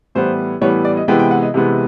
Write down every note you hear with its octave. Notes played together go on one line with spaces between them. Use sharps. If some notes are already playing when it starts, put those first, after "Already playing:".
A2 E3 G3 B3 C5
A2 E3 G3 B3 C#5
D5
D#5
C3 E3 G#3 B3 G5
G5
F#5
D#5
C3 E3 G#3 B3